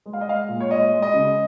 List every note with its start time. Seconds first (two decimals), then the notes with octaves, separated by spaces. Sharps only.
0.06 G#3
0.13 F5
0.21 D#5
0.27 G#3 F5
0.49 A#2
0.60 C#5
0.71 G#3 D#5
0.92 G#3
1.02 D#5
1.14 C#3